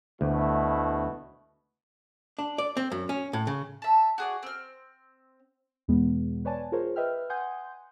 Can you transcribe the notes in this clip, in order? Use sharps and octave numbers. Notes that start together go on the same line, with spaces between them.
D2 B2 A3 E4
D4
D5
C4
F#2
C#4
A2
C#3
E5 A5
F#4 G#4 D5
C4 F6
E2 B2 G#3 B3
B4 C#5 D5 G#5 A5
F4 G#4 A#4 C5 C#5
B4 D#5 E5 G5 F6
F#5 G#5 C6 D#6 G6